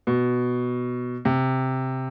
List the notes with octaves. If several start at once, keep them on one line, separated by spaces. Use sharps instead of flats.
B2
C3